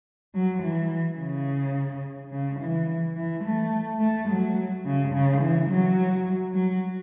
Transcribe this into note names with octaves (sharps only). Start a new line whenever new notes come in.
F#3
E3
C#3
C#3
E3
E3
A3
A3
F#3
C#3
C#3
E3
F#3
F#3